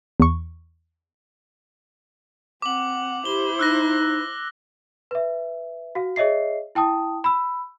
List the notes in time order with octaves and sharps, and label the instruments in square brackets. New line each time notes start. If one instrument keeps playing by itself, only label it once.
[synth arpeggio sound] E2 C#6
[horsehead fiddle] C4 F#5 [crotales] D6 F#7
[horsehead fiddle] E4 C5 [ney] G4 [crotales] G7
[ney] D#4 [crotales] E6 F#6 A#6
[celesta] B4 E5
F#4 F5
G#4 C#5 D#5 E5 C7
E4 G5 A5 D#6
B5 E6